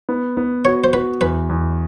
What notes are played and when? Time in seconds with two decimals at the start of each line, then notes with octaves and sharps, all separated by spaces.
0.09 B3
0.37 B3
0.65 F#4 C#5
0.84 C5
0.93 F#4 B4
1.21 E2 B4
1.49 E2